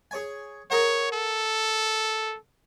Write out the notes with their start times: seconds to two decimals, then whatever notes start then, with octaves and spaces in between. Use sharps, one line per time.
0.11 G#4 C#5 G#5
0.71 G#4 A#4 C#5 F#5
1.12 A4